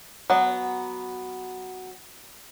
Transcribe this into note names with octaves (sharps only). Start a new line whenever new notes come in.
F#3 B3